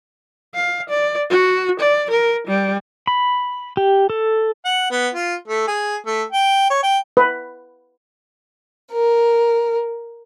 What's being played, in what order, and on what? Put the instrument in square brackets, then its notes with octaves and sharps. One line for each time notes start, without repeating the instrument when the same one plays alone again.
[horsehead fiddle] F5
D5
F#4
D5
A#4
G3
[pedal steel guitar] B5
G4
A4
[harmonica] F#5
B3
F4
A3
G#4
A3
G5
C#5
G5
[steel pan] B4
[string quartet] A#4